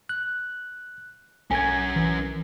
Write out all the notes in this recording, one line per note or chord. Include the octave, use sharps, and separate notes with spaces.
F#6
B1 C#4 A#4 G#5 G#6
E3